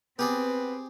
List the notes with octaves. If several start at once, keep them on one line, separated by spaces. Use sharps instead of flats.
B3 C4 G4 G#4 B4 D5